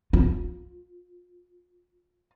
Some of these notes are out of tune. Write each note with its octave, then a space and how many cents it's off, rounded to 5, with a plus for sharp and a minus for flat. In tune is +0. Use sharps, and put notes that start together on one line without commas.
F4 +30